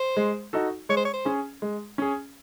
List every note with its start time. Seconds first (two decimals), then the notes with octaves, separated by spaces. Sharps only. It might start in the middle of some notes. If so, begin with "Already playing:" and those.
Already playing: C5
0.17 G#3
0.53 D#4 F#4 A4
0.89 G#3 C#5
0.97 C5
1.05 C#5
1.14 C5
1.25 C#4 G#4
1.62 G#3
1.98 C#4 G#4